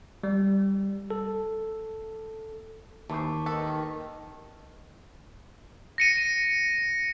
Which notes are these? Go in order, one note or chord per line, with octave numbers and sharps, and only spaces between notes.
G3
A4
D#2 E3 C5 A5 C#6 D6
D#3 A4 B4
A#6 C#7 D#7